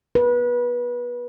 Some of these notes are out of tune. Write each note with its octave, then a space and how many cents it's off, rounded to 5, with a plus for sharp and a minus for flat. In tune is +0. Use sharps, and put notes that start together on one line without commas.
B4 -25